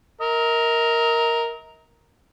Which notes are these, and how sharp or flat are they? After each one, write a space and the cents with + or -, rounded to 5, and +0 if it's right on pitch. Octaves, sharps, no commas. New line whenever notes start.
A#4 +0 D#5 +40